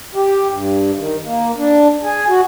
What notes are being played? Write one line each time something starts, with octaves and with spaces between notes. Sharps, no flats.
G4
G2
D#3
A#3
D4
G#4
F#4